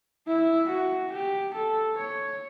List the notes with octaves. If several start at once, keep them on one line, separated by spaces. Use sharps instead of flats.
E4
F#4
G4
A4
C#5